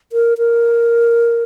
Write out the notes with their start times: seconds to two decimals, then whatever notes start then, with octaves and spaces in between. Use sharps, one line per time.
0.12 A#4
0.38 A#4